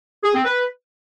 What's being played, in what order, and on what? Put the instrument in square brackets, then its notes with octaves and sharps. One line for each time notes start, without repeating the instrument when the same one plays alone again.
[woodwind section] G#4
C4
B4